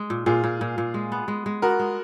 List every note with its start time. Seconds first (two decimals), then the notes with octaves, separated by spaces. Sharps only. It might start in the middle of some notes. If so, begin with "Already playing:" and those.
Already playing: G#3
0.10 A#2
0.26 A#2 F4 G#4
0.44 A#2
0.61 A#2
0.78 A#2
0.94 G#3
1.12 B3
1.28 G#3
1.46 G#3
1.62 B3 F#4 A#4
1.79 G#3